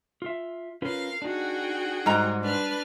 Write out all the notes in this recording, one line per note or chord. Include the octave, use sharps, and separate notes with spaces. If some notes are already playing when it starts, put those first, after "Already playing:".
F4 E5
C#4 F4 A#4 B4 F5
D4 D#4 F#4 G#4 G5
G#2 G3 A#5
D4 B4 F6